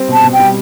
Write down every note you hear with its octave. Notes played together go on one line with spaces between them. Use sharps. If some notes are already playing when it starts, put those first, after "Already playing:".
Already playing: G3 C4
B2 A5
B2
G5
G3